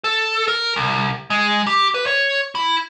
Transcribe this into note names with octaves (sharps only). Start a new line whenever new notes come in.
A4
A#4
C2
G#3
G4
B4
C#5
E4